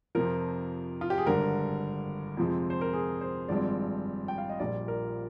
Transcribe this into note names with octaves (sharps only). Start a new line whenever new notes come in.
F2 C3 F3 A#4
F4
G4
G#4
G#1 G2 D3 A#4
F2 C3 F3 G#3 C4
C5
A#4
G#4
C5
G#1 G2 F3 G#3 C4 D5
G5
F5
D#5
A#1 A#2 G3 D5
A#4